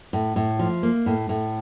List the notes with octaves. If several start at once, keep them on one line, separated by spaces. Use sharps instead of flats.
A2
A2
F3
A#3
A2
A2